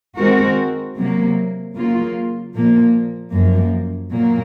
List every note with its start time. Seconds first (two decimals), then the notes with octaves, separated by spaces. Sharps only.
0.17 D#3 G#3 C4 F#4 A#4
0.96 C3 F#3 A#3
1.76 C#3 F#3 A#3 F4
2.55 A#2 F3 A#3
3.33 F#2 F3 A#3
4.12 A#2 F#3 A#3